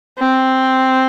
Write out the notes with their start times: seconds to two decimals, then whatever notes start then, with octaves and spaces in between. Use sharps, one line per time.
0.19 C4